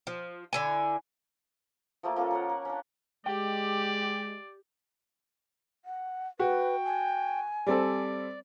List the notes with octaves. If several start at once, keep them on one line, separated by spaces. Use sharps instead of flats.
F3
D3 E4 G#5
F3 A3 A#3 D6
A#3 C#4 F4 A4
A#4 C#5 F#5
A#4
C#4 D4
G#3 G4 D5 G5
F#5
F#4 B4 G5
G#5
G3 C4 A4 D5